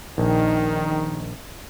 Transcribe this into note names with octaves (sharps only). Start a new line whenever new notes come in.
A#1 D#3